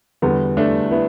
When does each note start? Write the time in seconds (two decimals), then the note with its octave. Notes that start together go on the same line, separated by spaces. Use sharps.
0.22 E2 D3 G3 B3
0.57 A3 D4
0.91 B3 E4